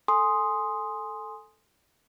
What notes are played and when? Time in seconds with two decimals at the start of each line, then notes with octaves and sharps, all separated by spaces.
0.08 A4 G#5 C6 D#6